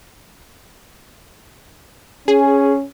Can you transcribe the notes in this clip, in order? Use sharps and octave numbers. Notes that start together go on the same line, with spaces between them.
C#4 G#4